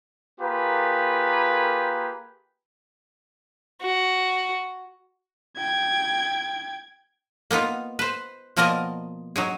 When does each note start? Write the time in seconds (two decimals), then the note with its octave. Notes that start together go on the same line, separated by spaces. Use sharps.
0.40 A#3 F4 G4 G#4 A#4 B4
3.82 F#4
5.56 G5 G#6
7.51 A#3 B3 D#4 F4
7.99 B4 C5
8.56 B2 F3 A#3 A#4 D5 D#5
9.36 F#3 D#4 G#4